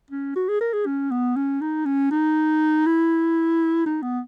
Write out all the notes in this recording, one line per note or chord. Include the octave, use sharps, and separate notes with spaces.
C#4
F#4
G#4
A#4
G#4
C#4
B3
C#4
D#4
C#4
D#4
E4
D#4
B3